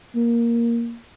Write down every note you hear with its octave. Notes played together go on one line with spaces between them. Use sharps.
A#3